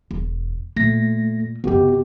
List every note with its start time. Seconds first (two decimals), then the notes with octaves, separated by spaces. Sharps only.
0.11 E1
0.76 A#2 A3 A#6
1.64 F#1 C3 B3 F#4 G4